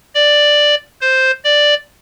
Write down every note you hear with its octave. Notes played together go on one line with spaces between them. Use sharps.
D5
C5
D5